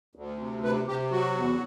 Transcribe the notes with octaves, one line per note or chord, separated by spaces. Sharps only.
D2
C3
C3 B4
C3 G4
F#3 F#4
E2